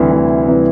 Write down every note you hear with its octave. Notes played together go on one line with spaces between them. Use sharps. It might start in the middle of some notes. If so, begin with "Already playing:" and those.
Already playing: D2 C3 E3 G3
D2
C3 E3 G3